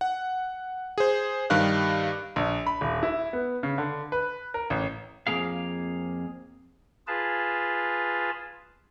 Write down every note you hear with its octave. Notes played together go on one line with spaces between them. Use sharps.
F#5
G#4 C5
G2 D#3 G4 F5 F#6
A#1
B5
D#1
E4
B3
C#3
D3
B4
A#4
A1
F2 F#3 A#3 G#4 F5
F4 G#4 B4 A5